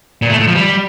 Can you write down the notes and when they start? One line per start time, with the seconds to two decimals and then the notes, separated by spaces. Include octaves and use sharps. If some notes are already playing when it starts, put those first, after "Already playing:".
0.22 A#2
0.30 A3
0.39 A2
0.47 F3
0.55 G3